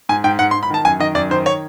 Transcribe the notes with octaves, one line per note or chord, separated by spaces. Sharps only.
G#2 G#5
G#2 G5
G#2 F#5
C6
G#2
B5
D#3 A5
F#2 G#5
D#3 D#5
F#2 D5
D#3 C5
C#5